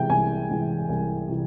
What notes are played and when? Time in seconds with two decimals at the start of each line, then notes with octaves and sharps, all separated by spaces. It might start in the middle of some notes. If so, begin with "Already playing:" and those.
Already playing: C3 E3 G#3 G5
0.09 C2 G#5
0.49 C3 E3 G#3
0.89 C2
1.28 C3 E3